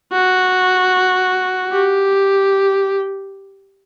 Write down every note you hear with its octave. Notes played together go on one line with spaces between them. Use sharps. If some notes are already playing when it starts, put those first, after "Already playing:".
F#4
G4